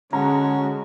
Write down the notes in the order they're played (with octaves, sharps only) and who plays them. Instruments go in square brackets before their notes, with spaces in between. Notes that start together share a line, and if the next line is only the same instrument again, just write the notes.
[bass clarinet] D3 [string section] G#3 F#4 [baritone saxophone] C#4 [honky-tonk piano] A#5